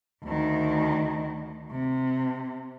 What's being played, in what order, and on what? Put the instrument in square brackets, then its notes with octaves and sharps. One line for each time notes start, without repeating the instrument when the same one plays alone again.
[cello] D2 D#3
C3